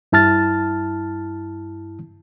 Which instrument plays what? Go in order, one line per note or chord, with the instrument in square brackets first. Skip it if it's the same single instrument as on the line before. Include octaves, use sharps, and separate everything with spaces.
[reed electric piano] G2 E4 A5 F6 A6